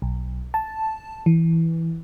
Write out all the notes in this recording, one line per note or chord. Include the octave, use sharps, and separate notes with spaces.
B1
A5
E3